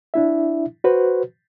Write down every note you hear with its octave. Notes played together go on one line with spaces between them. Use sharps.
D4 E4 E5
F#4 B4 C5